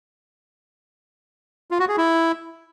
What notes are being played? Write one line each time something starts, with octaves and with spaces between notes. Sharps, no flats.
F4
F#4
G#4
E4